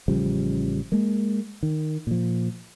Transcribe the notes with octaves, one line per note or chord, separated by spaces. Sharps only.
A1 C#3 F3 G3
G#3 A#3
D#3
A#2 F3